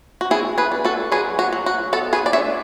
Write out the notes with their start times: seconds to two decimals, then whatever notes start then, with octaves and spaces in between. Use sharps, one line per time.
0.21 F#4
0.31 B3 E4 G#4
0.58 G#4 B4
0.72 D4
0.85 F#4 A4
1.12 F#3 G#4 B4
1.39 F#4
1.53 F#3
1.66 F#4
1.93 B3 F#4 A4
2.13 G#4 B4
2.26 D5
2.33 D4 C#5 E5